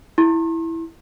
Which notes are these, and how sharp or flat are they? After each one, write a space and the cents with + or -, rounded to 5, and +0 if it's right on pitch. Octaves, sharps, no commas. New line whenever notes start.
E4 +0 C6 +45